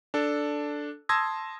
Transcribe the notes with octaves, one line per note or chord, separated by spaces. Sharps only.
D4 A4
A5 C6 D#6 E6 G#6 A#6